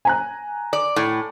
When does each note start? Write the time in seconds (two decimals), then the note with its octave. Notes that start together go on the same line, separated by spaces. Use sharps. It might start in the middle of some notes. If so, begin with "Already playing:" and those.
0.05 G#5 A#5 F#6
0.73 D5
0.96 A2